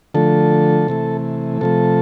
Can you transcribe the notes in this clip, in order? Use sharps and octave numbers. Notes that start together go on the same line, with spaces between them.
D3 F3 A3 A4
C3 E3 A3
C3 F3 A3 A4